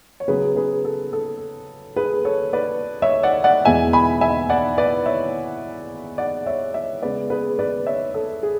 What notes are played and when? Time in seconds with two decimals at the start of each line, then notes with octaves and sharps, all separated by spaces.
0.20 C#5
0.28 C#3 F#3 B3 G#4 B4
0.56 G#4 B4
0.85 A4
1.13 A4
1.96 G#4 B4
2.25 A4 C#5
2.53 B4 D5
3.02 C#5 E5
3.23 D5 F#5
3.44 D5 F#5
3.65 E2 B2 G#3 B3 E5 G#5
3.93 G#5 B5
4.21 E5 G#5
4.50 D5 F#5
4.78 B4 D5
5.06 C#5 E5
6.18 D5 F#5
6.46 C#5 E5
6.74 C#5 E5
7.02 C#3 G#3 B3 B4 D5
7.30 G#4 B4
7.59 B4 D5
7.87 C#5 E5
8.14 A4
8.43 G#4